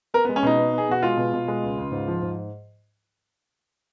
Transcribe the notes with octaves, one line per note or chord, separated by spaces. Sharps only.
B3 A#4
B3
G#3
C#4
B2 D#4
B3
B3 G#4
B2 F#4
G#3 F4
B2
B2
G#3
C#2
C#2
G#2
F3
G#2